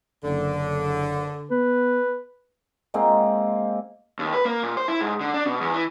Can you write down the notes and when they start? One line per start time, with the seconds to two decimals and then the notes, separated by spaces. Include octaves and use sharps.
0.24 F#1 D3
1.51 B3 B4
2.94 G#3 A#3 C4 F#5
4.19 D#2
4.34 B4
4.45 A#3
4.63 A#2
4.77 C5
4.88 E4
5.01 G#2
5.21 D3
5.34 D4
5.46 B2
5.61 E2
5.74 E3